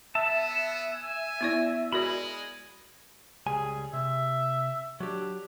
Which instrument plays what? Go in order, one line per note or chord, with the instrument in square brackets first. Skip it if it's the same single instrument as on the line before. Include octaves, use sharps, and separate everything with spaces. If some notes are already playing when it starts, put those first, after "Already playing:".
[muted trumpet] B3 [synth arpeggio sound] E5 [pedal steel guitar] A5
[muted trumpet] G#5
[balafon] B3 E4 D5
[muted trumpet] G#3 [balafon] F#4 A#4 D5 [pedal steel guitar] B5
[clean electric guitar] C#2 G3 G#5 [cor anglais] G#4
[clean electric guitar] C3 [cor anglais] E5
[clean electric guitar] F#3 G4 [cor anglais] D4